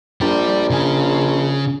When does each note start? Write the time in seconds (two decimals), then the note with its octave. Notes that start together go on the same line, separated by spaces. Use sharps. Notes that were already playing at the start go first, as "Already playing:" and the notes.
0.21 A#1 D5 G5
0.71 C#3 G#5